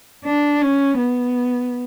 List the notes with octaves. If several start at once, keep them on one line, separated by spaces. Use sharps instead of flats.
D4
C#4
B3